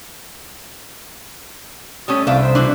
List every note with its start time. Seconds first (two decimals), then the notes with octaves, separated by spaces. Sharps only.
2.08 G3 A3 C#4 D#6
2.27 C2 D4 A4 E5 F5
2.41 C5
2.55 B2 E3 D4 B4